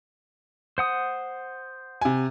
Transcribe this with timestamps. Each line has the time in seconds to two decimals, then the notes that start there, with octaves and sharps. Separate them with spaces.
0.78 C5 F#5 D#6
2.01 C3 G#5